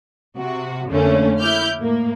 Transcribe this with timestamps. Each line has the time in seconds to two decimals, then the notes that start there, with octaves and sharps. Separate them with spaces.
0.38 C3 F#4
0.90 F2 D3 A3 A#3 C#4
1.39 E4 D6 F6 G6
1.79 A2 A#3